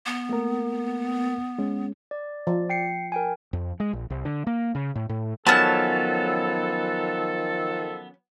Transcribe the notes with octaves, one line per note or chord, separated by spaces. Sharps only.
B3
A3 A#3 A#4
G#3 C#4
D5
F3 D5
G5 C7 C#7
A#4 G5 G#5
F2
G#3
A#1
C2
D3
A#3
C#3
A2
A2
D#3 F3 F#3 B3 C#4 A4 A5